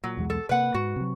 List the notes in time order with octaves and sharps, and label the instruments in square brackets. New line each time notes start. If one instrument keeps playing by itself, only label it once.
[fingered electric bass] A#2 [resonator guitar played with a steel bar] F#3
[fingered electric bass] B1 E2 G#3
[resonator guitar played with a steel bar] A4
[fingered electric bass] C3 A#3 [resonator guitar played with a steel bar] B4 F#5
[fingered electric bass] G#2 [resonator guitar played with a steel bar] F#4
[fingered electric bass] C3 F#3